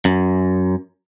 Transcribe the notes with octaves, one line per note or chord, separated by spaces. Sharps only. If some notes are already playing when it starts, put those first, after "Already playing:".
F#2